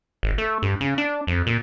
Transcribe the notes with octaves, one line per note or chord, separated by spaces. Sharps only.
G#1
A3
G2
C#3
D4
F2
A#2